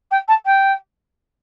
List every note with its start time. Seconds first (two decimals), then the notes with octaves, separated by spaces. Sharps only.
0.11 G5
0.28 A5
0.45 G5